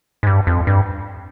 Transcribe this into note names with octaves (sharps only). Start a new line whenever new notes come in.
G#2
G2
F2
G2